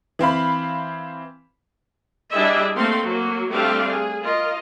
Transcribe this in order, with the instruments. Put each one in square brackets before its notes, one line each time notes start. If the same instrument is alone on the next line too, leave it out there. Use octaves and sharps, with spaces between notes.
[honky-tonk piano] E3 C4 F5 B5
[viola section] G3 D4 E4 G#4 D#5 E5
A3 A#3 C4 F5 C6
F#3 A#3
G3 A3 C4 D4 G4 F5
G#4
F4 A#4 D#5